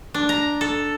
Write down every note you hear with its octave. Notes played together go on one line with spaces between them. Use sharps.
D4
A#5
A4